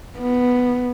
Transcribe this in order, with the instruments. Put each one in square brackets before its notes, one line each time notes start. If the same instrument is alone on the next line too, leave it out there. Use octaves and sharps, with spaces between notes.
[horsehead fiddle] B3